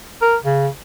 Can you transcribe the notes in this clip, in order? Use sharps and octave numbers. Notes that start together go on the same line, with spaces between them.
A#4
C#3